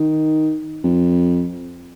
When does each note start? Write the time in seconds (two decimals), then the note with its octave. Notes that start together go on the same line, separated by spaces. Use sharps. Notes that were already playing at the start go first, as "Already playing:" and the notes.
Already playing: D#3
0.84 F2